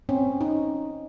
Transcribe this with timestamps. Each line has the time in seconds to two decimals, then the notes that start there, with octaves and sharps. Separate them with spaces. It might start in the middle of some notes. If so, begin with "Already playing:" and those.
0.09 C4 C#4
0.41 D#4